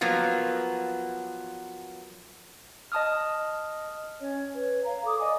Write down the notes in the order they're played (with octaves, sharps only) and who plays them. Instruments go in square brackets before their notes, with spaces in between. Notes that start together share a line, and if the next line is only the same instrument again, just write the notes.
[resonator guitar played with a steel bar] F3 F#3 A#3 B3
[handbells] D#5 A5 D#6 F6
[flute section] C#4 C#5
B4 C#5
F5 A#5
A4 D6 D#6
D5 D#5 G#5